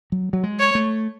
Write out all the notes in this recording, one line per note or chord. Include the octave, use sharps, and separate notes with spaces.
F#3
F#3
G#3
C#5
A3